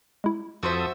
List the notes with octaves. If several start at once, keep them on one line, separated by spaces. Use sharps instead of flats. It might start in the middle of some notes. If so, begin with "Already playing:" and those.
G#3 E4
F2 F#4 A4 C5 E5 D#6